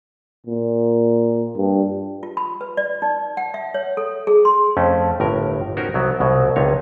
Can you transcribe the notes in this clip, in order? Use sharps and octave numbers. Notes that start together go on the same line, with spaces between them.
A#2
G2
F4
B5
B4
D5
D#4
F#5
E5
C#5
A4
G#4
C6
F2 A3 C#4
G1 A2 A#4
C#4 D#4 F#4 G4 A#4 C5
C2 F#3 B3
C2 B2 F#3
C#2 C3 D#4 C#5